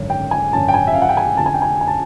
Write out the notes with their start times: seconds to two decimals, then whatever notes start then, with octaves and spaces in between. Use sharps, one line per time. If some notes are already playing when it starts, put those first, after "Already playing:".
Already playing: G#1 F#2 D3
0.10 G5
0.31 G#5
0.53 G#1 F#2 D3 A5
0.68 G5
0.74 G#5
0.87 E5
0.94 F5
1.02 F#5
1.09 G5
1.17 G#5
1.37 F2 D3 F3 A5
1.46 G#5
1.54 G5
1.62 G#5
1.81 G#5
1.87 A5